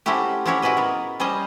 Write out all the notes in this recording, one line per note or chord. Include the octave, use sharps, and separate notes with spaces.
A3 C4 C#4 E4 F#4 G4
C4 C#4 E4 F#4 G4 C#5
E4 F#4 G#4 B4 D#5
B3 A#4
G3 C#4 C5 C#5 D#5